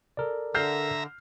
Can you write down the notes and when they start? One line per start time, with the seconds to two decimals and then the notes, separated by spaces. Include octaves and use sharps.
0.17 A4 A#4 D5
0.55 D3 E5 A#5 F6 G6 C7